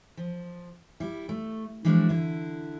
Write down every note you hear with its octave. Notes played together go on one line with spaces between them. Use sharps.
F3
G3 E4
A3
E3 F3 G#3 D4 F#4
D3 E4